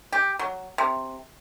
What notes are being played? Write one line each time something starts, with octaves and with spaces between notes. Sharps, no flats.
G4
F#3
C3